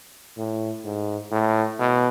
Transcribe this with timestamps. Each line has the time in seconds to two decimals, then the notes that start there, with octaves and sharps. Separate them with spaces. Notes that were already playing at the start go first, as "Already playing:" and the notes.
0.38 A2
0.85 G#2
1.31 A2
1.79 B2